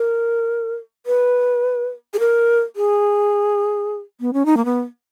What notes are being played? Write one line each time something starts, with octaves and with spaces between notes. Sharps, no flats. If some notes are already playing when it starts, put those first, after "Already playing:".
Already playing: A#4
B4
G#4
A#4
G#4
B3
C#4
D#4
A#3
B3